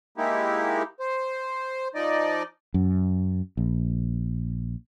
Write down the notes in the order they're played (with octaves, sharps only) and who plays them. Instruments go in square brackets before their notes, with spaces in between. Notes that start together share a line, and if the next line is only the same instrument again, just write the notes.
[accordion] G#3 A#3 D#4 E4 G4
C5
F3 D#4 D5 D#5
[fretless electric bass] F#2
A#1